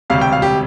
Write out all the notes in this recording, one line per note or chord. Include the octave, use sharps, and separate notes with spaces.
E1 D2 C3 G3 F5
G5
F5
G4